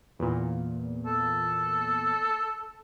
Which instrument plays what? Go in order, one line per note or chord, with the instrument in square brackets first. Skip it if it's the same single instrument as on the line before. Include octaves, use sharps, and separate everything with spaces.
[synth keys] E2 A#2
[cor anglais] A4